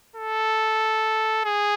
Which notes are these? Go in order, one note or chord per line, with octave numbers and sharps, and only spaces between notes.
A4
G#4